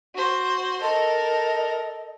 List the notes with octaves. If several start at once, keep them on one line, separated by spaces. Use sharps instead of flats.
F#4 C5
A4 A#4 D#5